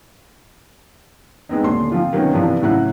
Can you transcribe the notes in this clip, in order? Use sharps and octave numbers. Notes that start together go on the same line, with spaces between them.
G#3 B3 C4 D#4
D#1 D3 A3 C6
F3 C4 F4
C3 D#3 F#3 A#3 B3 C#4
C3 E3 F3 B3 D4
A2 C#3 F#3 E4 F#5 F#6